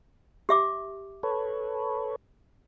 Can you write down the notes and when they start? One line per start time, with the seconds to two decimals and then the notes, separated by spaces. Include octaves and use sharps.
0.49 G4 E5 D6
1.23 A4 B4 C#5